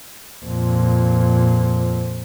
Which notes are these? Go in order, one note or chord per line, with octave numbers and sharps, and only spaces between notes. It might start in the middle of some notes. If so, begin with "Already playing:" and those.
F2 A#2